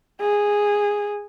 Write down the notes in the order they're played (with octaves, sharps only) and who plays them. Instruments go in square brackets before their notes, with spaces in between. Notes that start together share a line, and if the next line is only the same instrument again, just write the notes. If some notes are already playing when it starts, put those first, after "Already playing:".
[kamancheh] G#4